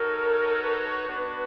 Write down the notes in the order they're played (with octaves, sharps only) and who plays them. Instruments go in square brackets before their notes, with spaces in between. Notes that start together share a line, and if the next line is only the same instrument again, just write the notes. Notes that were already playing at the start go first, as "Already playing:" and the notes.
Already playing: [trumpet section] D#4 F#4 A4 C#5 [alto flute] A#4
[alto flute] B4
[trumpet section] B3 D4 F#4